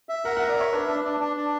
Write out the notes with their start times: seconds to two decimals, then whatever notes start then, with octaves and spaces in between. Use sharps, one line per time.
0.09 E5
0.25 A#4 F#5
0.36 A#4 F#5
0.49 D5
0.57 C#5 E5
0.72 D4 B4
0.88 D4
1.04 D4
1.20 D4
1.37 D4